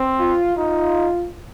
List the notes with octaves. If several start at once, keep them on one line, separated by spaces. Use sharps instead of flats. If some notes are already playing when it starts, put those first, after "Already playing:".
Already playing: C4
F4
D#4 F4